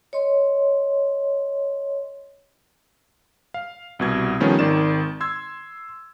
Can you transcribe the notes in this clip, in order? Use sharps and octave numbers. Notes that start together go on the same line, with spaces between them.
C#5 D#5 C6
F5
C2 B2 G#6
D#3 F3 G3 A3 B3 C#4
G#1 D#3 D5 E7
C6 E6 G#6